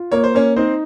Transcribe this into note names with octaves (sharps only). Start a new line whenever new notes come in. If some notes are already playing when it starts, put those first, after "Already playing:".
Already playing: F4
A#3 C#5
C5
A#3 C#4 C#5
C4 D#4 C5